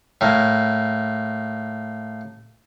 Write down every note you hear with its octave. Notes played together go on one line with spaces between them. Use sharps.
A2 A#3